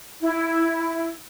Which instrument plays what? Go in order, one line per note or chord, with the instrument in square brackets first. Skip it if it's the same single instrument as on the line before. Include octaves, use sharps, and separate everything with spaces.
[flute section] E4